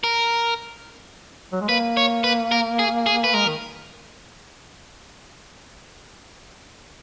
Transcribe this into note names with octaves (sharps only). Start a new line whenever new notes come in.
A#4
F#3
G#3
A#3 B4
C#5
B4
A#4
G#4
G#4
B4
G#3 A#4
D#3